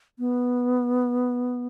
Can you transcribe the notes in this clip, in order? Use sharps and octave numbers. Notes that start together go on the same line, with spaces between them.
B3